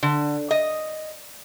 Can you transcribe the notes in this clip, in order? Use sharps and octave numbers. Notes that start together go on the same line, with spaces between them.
D3
D#5